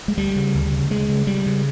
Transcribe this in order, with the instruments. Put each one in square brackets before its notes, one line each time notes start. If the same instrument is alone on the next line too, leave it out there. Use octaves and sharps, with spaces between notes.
[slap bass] G#3
D2 G3
C#3
D2
C#3
C#3 G#3
C#3
C#3 G3
C#3